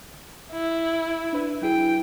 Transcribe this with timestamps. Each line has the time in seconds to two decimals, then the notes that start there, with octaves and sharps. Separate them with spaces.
0.52 E4
1.33 D4 B4 E5
1.62 F#3 E4 G#4 G5